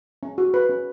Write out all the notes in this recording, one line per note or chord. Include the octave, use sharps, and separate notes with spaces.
C#4
F#4
B4
C#4